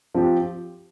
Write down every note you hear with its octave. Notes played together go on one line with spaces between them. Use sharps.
F3 C4 G4